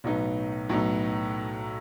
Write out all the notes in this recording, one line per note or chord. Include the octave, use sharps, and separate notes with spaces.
B1 A2 F#3 B3 D#4
B1 A2 F#3 B3 D#4